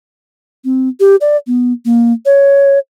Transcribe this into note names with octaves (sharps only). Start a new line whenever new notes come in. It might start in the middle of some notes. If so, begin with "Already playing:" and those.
C4
G4
D5
B3
A#3
C#5